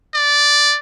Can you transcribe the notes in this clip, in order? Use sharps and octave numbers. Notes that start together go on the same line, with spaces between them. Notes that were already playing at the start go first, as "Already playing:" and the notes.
D5